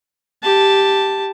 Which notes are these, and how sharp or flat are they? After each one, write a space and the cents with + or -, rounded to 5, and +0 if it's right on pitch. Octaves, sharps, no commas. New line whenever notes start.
G4 +0 A5 +0